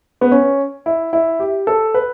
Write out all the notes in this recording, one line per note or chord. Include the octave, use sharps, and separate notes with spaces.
B3
C#4
E4
E4
G4
A4
B4